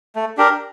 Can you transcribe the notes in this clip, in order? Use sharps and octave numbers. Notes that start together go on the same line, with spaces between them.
A3
D4 G4 A#4